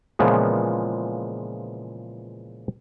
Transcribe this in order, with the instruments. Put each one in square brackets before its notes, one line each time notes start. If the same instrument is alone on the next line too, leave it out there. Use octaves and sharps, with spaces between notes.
[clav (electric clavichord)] A#2 C#3 E3 F3 G#3 B3